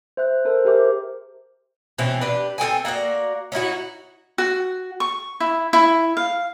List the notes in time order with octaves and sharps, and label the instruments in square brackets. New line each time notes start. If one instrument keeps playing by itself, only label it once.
[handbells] C5 E5 F#6
A4 A#4 C5
G4 G#4 A#4 C5 E5 D6
[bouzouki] B2 E3 C4 C#4
D4 G4 B4
C4 A4 G5 G#5
A#3 F#4 A#4 D5
C#4 D#4 E4 F#4
[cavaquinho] F#4
C#6
E4
E4
F5